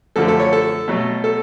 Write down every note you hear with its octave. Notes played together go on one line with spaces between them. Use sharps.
F#2 D3 F3 A3 A4
A4
C#5
A4
B2 F#3 A3
A4